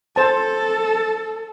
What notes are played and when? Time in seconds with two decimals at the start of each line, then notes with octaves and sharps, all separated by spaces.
0.16 A4 C5 A5